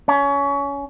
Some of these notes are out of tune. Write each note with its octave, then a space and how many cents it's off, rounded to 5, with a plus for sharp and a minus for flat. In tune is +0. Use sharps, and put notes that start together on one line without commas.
C#4 +25